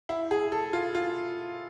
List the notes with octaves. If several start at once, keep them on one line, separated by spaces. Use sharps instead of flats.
E4
G#4
A4
F4
F4